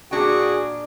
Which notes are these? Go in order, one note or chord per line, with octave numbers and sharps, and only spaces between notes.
A#2 D4 F#4 G#4 G5